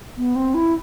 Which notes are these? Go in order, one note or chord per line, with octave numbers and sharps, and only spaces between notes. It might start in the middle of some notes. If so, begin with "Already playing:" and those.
B3
C4
E4